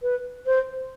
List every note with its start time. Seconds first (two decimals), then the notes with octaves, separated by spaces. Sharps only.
0.02 B4
0.46 C5